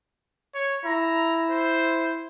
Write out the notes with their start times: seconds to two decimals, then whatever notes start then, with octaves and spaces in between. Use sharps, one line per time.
0.55 C#5
0.85 E4 A#5
1.51 C5